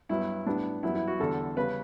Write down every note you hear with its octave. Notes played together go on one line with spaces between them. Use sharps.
G2 F#3 B3 E4
A2 G3 B3 D4
F#2 E3 G3 B3 E4
E4
F#4
E2 D3 G3 A4
C#3 G3 B3 B4